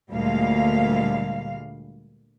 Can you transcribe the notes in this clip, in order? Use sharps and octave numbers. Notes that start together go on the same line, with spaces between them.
D2 A#2 G3 G#3 F5